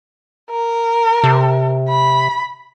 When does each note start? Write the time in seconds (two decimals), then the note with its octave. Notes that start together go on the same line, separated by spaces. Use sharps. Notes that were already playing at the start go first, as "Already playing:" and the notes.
0.50 A#4
1.24 C3
1.88 B5